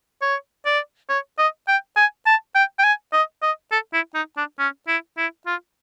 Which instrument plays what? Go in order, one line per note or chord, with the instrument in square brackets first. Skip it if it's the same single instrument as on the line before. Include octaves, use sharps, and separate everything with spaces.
[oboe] C#5
D5
C#5
D#5
G5
G#5
A5
G5
G5
G#5
D#5
D#5
A4
E4
D#4
D4
C#4
E4
E4
F4